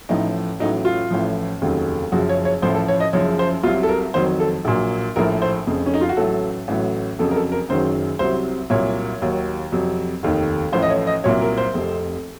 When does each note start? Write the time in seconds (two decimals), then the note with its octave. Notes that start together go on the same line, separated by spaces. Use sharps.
0.09 A1 A2 F3 D#4
0.59 A1 A2 F#3 D#4
0.85 F4
1.11 A1 A2 F3
1.62 F1 D#2 C#3 F#3
2.12 F#1 F#2 C#3 F3 F#4
2.29 C#5
2.45 C#5
2.62 A1 A2 F3 C5
2.75 A4
2.88 C#5
3.00 D#5
3.13 F#1 F#2 C#3 F3 C#5
3.39 C5
3.63 C2 C3 F#3 F4
3.83 A4
3.89 A#4
4.14 F2 D#3 F#3 C5
4.40 A4
4.65 A#1 A#2 F#3
5.16 A#1 A2 F3 A#4
5.42 C5
5.67 F1 F2 C#3
5.86 C#4
5.94 D#4
6.01 F4
6.09 F#4
6.17 A1 A2 F#3 A4
6.68 A1 A2 F#3
7.19 F2 C#3 F#3 A4
7.31 A#4
7.36 A4
7.52 A#4
7.69 F#1 F#2 D#3 F#3 C5
8.19 C2 C3 F#3 C5
8.70 C2 A#2 F#3 C#5
9.22 D#2 D#3 F#3
9.72 F2 C3 F#3
10.23 F1 D#2 D#3
10.73 A1 A2 F3 C5
10.82 D#5
10.90 C#5
11.07 D#5
11.24 C2 A#2 F#3 C#5
11.41 A#4
11.58 C5
11.74 F1 F2 C3